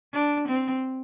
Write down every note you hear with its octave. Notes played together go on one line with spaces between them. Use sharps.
D4
C4